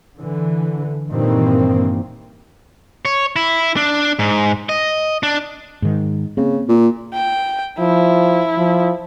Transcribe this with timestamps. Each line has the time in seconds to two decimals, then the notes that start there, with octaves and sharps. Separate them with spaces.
0.19 D3 E3
1.11 G2 A#2 D#3 E3 A#3 C4
3.05 C#5
3.36 E4
3.77 D4
4.19 G#2
4.69 D#5
5.23 D4
5.82 G#2 D#3
6.37 C#3 A#3 C4
6.69 A#2
7.14 G5
7.79 F3 E4
8.58 F3